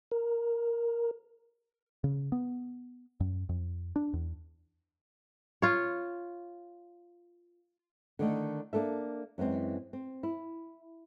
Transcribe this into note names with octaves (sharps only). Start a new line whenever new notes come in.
A#4
C#3
B3
F#2
F2
D4
E2
F4 C#5
D3 D#3 A3
A#3 D4 A4 E5
F#2 E3 G#3 C4
C4
E4